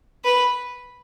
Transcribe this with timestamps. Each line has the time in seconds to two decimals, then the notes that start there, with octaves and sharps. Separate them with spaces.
0.25 B4